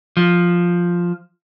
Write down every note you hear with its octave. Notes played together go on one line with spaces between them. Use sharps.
F3